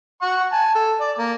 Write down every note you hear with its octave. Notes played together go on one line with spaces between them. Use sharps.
F#5 C#6
G#5 A5
A4
D5
A#3